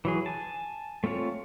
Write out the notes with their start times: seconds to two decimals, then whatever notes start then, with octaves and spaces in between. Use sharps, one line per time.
0.05 E3 F#3 G#4
0.26 G#5 A5
1.04 A3 C4 F4 C#5